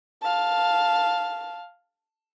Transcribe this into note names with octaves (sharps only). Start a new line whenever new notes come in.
F5 A5